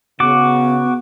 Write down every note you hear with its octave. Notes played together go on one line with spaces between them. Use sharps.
C#3 B3 F#4 D6